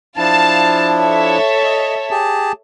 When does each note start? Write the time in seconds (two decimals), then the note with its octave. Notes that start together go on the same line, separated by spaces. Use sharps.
0.17 F3 D4 E4 F5 A5
1.01 A4 C#5 E5
1.63 D#5
2.11 G4 G#4 A5